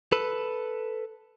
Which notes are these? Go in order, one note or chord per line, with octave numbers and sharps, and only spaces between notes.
A4 B4